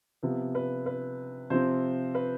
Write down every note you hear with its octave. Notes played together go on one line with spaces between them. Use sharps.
C3 F3 B3
B4
B4
C3 F3 C4 C5
B4